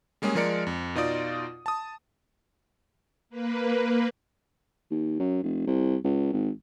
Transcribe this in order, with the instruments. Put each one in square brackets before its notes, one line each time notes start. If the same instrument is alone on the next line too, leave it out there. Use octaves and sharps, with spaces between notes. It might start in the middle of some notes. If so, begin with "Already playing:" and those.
[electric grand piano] G3 G#3 A#3 C#4 G#4
F3 G#3 A#4 D5 C#7
F2
B2 D#4 F4 D5 D#6
A5 D#6
[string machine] A#3 B4
[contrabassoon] D#2
F#2
F1
C2
C#2
G#1